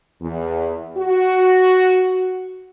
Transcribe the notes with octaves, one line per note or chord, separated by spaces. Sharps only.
E2
F#4